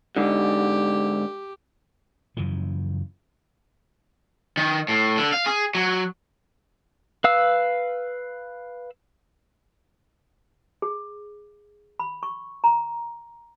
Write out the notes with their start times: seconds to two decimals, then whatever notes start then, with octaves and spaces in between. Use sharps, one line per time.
0.17 G#2 D3 G4
2.37 F#2 C#3 E3 F3
4.57 D#3
4.88 A2
5.18 D3
5.32 F5
5.46 G#4
5.75 F#3
7.24 B4 F5 E6
10.82 G#4
11.99 B5
12.23 C#6
12.64 A#5